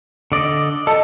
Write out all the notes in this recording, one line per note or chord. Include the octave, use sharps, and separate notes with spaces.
D3 D5 D#5
A4 D#5 A5